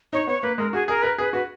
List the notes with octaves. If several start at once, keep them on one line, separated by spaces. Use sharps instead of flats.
D#4 C#5
B3 C#5
A#3 B4
G#3 A#4
F#4 G#4
G#4 A#4
A#4 B4
G#4 B4
F#4 B4